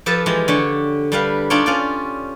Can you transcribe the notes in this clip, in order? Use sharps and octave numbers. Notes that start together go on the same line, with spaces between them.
F3 G4 A4 B4 A5
E3 F3 G#3 G4
D3 G4 C#5
G3 D4 G4 B4 F5
D4 D#4 F4 G4 C#5 G5
C#4 F4 D5